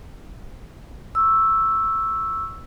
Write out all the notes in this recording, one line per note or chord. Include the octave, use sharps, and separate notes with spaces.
C#6 E6